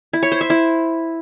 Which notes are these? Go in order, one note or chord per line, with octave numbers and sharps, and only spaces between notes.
E4
C#5
C5
E5
E4